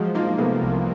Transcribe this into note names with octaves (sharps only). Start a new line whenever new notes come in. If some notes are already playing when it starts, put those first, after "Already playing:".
Already playing: F3 F#3 G#3
A#3 D#4 F4
D#4 F4
C3 A3 B3
C2